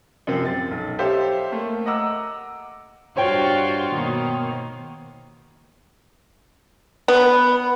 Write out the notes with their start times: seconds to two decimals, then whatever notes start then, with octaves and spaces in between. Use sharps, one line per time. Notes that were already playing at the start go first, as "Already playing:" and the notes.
0.27 F#2 C3 F3 C4
0.45 A6
0.71 B1
0.99 G4 A4 C5 C#5 E5 F5
1.52 A3 A#3
1.86 D#5 F#5 A#5 D6 E6
3.17 G2 F4 F#4 C5 C#5 G5
3.92 B2 D#3 A#3
7.08 B3